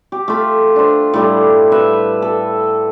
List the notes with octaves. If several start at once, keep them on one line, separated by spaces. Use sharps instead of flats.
G4
A3 F4
D4 C5
A2 G3
B4 E5
A4